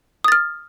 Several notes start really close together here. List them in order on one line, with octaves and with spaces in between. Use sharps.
D#6 A6 F6